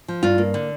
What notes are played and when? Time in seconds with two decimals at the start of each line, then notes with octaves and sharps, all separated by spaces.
0.08 F3
0.23 G2 F4
0.38 A#3
0.54 D3